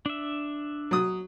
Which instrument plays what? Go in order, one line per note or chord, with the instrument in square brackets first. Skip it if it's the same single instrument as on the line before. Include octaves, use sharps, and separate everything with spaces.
[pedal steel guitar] D4 E5
[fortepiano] F#3 D#6